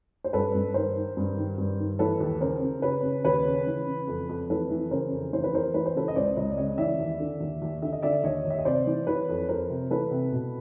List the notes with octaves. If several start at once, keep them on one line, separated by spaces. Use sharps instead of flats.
C5
G2 A4 B4
G2
D#3 A#4 C5
D#3
G2
D#3
G2
D#3
E3 A4 B4
D#2
C#3 A#4 C5
C#3
C#3 B4 C#5
C#3
D#2 B4 C#5
C#3
E3
C#3
F2
F2
E3 A4 B4
E3
C#3 A#4 C5
F2
E3 C5
B4
E3 A#4 C5
E3 B4
C5
C#3 A4 B4
D#5
C#2 C5 D5
C#2 C#5 D#5
D5
C#3 C#5 D#5
E3 D5 E5
D#2
D3
D#2
D#2
D3 E5
D#5
D3 D5 E5
D#2 C#5 D#5
D#2
E5
D#5
C3 C5 D5
E3
E3 B4 C#5
F2
F2 A#4 C5
C3
E3 A4 B4
C3
B2